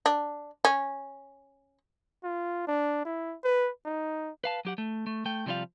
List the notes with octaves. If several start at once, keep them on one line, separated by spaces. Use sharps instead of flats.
D4
C#4
F4
D4
E4
B4
D#4
B4 F5 A5
F#3 G4 F#5
A3
A3
A3 G5
C3 F3 G3 F4 F5